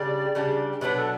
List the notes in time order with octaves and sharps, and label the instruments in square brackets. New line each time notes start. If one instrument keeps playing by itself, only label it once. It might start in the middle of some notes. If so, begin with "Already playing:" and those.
Already playing: [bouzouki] C#3 G3 D4 G4 [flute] D5
[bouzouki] C#3 G3 D4 G4
[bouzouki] B2 F#3 B3 D4 [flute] B4
[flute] A4